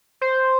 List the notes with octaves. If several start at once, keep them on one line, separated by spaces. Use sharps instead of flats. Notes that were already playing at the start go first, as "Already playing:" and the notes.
C5